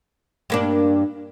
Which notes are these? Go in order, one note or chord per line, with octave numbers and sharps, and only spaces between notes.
G2 A#3 D4